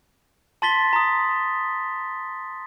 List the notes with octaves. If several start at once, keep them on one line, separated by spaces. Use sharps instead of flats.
A5 C6 A6 B6 G7
A#5 D#6